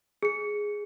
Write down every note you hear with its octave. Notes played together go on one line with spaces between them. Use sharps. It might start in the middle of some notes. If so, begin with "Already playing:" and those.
G#4 C#7